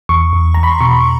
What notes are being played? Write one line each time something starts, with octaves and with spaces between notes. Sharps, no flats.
E2 C#6
E2
E2 A#5
B5
C6
B2 C#6